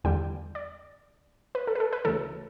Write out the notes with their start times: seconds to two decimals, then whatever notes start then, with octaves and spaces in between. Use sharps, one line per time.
0.04 E2 D3 G3 G5
0.55 D5
1.55 B4
1.67 A4
1.75 B4
1.80 A4
1.93 B4
2.05 D2 C#3 E3 A4